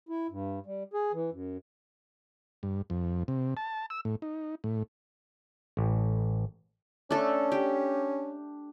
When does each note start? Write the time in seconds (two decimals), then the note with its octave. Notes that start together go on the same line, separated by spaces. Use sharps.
0.09 E4
0.30 G2
0.66 G3
0.93 G#4
1.13 E3
1.31 F#2
2.63 G2
2.90 F2
3.28 C3
3.57 A5
3.90 E6
4.05 A2
4.22 D#4
4.64 A2
5.77 A1
7.11 A3 C#4 D4 A4
7.52 G4